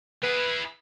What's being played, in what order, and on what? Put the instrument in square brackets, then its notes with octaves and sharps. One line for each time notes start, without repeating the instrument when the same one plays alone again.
[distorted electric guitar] E4 G#4 [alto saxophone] B4